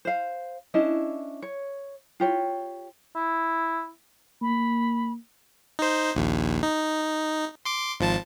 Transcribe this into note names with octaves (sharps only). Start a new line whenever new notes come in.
C5 F5
C#4 D4 E4 D#5
C#5
F4 G4 C#5
E4
A#3 B5
D#4 C5
A#1 D#2
D#4
C6 D6
G#1 F3 A5